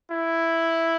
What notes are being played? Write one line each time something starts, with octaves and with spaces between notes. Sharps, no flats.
E4